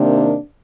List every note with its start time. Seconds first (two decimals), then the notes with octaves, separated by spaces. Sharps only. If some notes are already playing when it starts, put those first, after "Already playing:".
Already playing: C3 D#3 A#3 D4